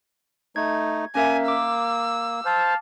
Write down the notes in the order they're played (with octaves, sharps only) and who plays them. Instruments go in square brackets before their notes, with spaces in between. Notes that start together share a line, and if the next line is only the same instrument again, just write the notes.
[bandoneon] A3 D#4 [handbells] G#6
[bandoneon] A#3 [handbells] C#4 A#4 E5 [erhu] G#5
[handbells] D6 [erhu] E6
[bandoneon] C5 [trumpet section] F5 A5